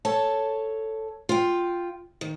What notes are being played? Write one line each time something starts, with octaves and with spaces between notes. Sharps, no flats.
A4 C#5 A5
F4 G5
D#3